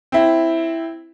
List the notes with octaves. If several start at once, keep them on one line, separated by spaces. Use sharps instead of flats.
C4 E4